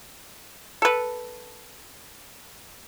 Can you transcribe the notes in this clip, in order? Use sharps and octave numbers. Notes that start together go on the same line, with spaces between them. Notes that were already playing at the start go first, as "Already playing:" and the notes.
A4 B4